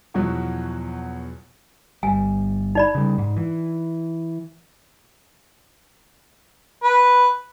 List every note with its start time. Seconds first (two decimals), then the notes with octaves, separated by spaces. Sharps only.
0.14 E2 B2 F3 F#3
2.03 G1 G3 G#5
2.75 D#4 D5 B5
2.95 C#3 G3
3.18 G#2
3.37 E3
6.83 B4